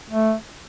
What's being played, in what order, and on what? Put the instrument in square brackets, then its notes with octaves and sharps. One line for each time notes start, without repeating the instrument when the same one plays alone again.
[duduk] A3